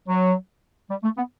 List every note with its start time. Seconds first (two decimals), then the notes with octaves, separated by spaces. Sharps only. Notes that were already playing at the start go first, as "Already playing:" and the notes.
0.08 F#3
0.89 G3
1.03 A3
1.17 B3